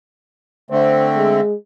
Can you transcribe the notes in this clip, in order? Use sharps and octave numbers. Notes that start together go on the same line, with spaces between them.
D3 A3 C4 C5
G#3